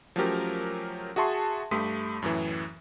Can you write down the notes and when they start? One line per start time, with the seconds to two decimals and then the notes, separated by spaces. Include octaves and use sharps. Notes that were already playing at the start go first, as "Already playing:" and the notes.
0.16 F3 F#3 A3 C#4 G4 A#4
1.16 F#4 G#4 E5 A5 C6 C#6
1.71 G2 A3 G4 C6 D#6 B6
2.22 F#2 A2 E3